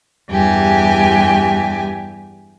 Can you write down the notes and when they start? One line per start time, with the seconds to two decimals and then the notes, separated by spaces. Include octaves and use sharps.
0.29 E2 G2 G4 G#5